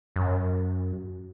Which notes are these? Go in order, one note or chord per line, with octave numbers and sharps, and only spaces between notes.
F#2